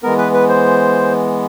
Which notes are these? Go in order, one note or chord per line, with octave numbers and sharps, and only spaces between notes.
E3 G#3 B3 A#4
B4
B4
C5